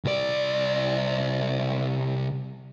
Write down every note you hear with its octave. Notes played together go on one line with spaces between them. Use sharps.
C2 D5